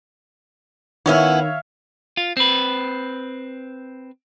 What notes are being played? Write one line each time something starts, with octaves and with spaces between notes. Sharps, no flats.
D#3 B3 C#4 E4 C#5 E5 F5
F4
C4 B4